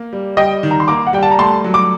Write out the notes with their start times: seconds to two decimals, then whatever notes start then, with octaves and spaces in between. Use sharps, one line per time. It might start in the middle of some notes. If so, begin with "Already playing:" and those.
Already playing: A#3
0.13 G3
0.37 G3 D#5 G5
0.63 D#3
0.71 A#5
0.80 C6
0.88 A#3 A#5 D6
1.07 F#5
1.13 G3 G5
1.23 A5
1.31 A#5
1.39 A3 A5 C6
1.64 F#3
1.74 D6